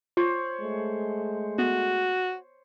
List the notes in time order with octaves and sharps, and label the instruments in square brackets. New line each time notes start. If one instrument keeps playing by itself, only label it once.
[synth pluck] F4 [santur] C5 C#5 B5
[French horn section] G#3 A3
[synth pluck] B3 [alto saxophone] F#4